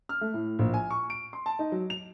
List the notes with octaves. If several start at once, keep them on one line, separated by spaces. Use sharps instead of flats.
F6
A3
A2
A#1
G#5
C#6
D7
C6
A5
D#4
F#3
F7